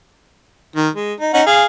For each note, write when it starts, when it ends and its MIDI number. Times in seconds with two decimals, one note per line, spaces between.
0.76 0.89 51
0.95 1.13 56
1.20 1.33 63
1.34 1.41 61
1.34 1.41 63
1.34 1.41 78
1.46 1.65 68
1.46 1.65 77